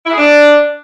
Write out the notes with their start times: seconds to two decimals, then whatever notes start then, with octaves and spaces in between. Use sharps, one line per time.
0.06 E4
0.12 G#4
0.18 D4